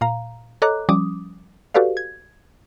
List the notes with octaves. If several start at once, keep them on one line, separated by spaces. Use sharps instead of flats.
A#2 F5 A#5
A4 C#5 D#5 A#5 D6 F#6
F3 G3 C#4 D6 D#6
F#4 G4 A4 B4 D5 F5
G#6